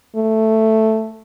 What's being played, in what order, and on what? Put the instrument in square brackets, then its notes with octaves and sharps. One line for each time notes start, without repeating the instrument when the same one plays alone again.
[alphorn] A3